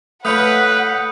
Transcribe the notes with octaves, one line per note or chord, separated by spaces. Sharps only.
A3 F4 B4 C#5 F#5 D#6 G6 C#7